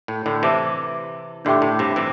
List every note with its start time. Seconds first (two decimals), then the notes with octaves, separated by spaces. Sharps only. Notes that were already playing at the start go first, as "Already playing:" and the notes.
0.08 A2
0.26 A2 D3
0.42 C3 E3 E4 C5 E5 A5 D6
1.45 A2 D3 D4 G4 E5 G5 D6
1.62 A2
1.79 G2 C3
1.96 C3 E3